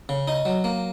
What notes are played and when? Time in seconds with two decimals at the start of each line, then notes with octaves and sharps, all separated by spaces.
0.09 C#3
0.28 D#4
0.45 F#3
0.64 A#3